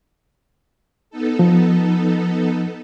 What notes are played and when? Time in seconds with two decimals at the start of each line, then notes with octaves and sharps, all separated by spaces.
1.10 B3 D#4 A4
1.39 F3